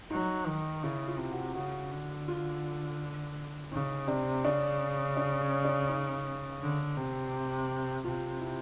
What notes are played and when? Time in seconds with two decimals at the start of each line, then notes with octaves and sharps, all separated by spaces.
0.11 F#3 D#4
0.47 D#3
0.83 C#3 E4
1.08 F4
1.19 C3
1.32 F#4
1.55 C#3 F#4
1.92 D3
2.28 F4
3.71 C#3 D#4
4.07 C3 D4
4.44 C#3 D4
5.17 D4
5.41 C#4
5.65 D4
5.89 D#4
6.61 D3
6.97 C3
8.04 C3 F4
8.40 E4